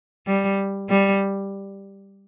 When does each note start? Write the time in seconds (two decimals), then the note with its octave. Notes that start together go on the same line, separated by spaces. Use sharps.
0.27 G3
0.90 G3